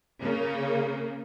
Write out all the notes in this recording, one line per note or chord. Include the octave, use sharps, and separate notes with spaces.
C#3 A#3